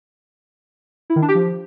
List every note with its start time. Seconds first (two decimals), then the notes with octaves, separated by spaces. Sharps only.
1.10 E4
1.16 D#3
1.22 D4
1.28 G4
1.35 F3